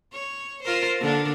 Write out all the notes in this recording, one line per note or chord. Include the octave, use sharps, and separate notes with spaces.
C#5
F4 A#4 C5
D3 A#3 D4